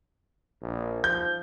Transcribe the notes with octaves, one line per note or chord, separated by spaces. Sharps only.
A#1
F3 G6